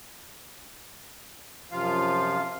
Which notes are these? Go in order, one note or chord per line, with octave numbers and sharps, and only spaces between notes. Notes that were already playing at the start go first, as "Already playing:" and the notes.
F#2 C3 F3 F4 F5